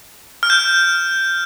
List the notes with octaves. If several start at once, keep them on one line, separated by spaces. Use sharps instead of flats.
F6
G6